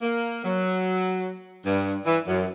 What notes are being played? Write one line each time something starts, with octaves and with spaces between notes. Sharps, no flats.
A#3
F#3
G2
E3
F#2